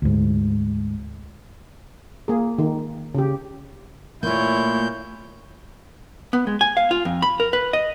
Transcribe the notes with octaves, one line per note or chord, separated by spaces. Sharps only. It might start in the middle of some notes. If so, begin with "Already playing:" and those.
D2 G#2
A#3 G#4
D#3
C#3 G4
A#2 A3 A#3 E4 C#5 G6
B3
G#3
G#5
F5
F4
F2
B5
A#4
B4
D#5